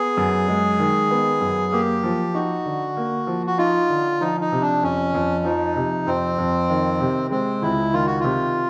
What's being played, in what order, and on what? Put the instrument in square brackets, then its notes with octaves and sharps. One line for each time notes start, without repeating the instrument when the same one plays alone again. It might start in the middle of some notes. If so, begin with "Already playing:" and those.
Already playing: [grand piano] B3 [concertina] G#4
[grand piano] F#2
G#3
D#3
B3
F#2
[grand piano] A#3 [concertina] G4
[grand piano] F3
[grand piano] D#4 [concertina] F#4
[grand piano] D3
A#3
F3
[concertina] F#4
[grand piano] D#4 [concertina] F4
[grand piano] D3
[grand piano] F3 [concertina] D#4
[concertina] D#4
[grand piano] C3
[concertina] D4
[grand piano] F2 [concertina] C#4
[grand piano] F2
[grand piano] F3 [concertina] D#4
[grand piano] C3
[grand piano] F2 [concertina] C4
[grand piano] F2
D#3
C3
[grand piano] G#3 [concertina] C4
[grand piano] C#2 [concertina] E4
[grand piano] D#3 [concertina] F4
[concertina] F#4
[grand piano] C3 [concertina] F4